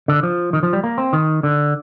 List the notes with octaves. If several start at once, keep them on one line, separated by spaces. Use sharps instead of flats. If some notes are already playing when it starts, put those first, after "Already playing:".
D3
F3
D#3
F3
G3
A#3
C4
D#3
D3